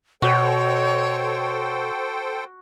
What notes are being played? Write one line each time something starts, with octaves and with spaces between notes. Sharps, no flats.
B2 F#4 A4 C5 C#5 G5